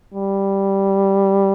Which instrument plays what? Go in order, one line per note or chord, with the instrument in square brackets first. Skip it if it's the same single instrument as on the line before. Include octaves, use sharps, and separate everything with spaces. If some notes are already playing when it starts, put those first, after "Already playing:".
[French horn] G3